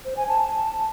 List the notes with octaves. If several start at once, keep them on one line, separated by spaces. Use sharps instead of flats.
C5
G#5
A5